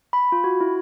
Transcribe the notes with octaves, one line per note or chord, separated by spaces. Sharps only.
B5
F4
F#4
E4